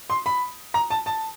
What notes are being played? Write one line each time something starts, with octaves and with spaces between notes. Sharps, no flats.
C6
B5
A#5
A5
A5